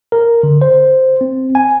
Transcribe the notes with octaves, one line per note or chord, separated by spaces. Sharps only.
A#4
D3
C5
C4
G#5